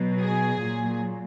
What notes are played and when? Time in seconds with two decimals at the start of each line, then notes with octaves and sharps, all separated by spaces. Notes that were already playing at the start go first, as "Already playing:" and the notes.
Already playing: B2 F#3
0.20 G#4
0.59 A#2 F#3